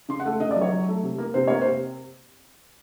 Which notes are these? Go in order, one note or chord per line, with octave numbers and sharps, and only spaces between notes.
C#3 C6
F#5
A3
C#3 D#5
D5
F#3
C#5
F#3
A3
C3
A#3
C3 C5
A#3 C#5
C3 C5